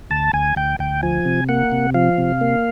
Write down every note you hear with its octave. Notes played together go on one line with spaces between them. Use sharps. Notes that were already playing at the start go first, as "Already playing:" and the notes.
D2 A5
D2 G#5
D2 G5
D2 G5
F3 G#5
C3
A#3 F#5
C3
F3 F5
C3
A#3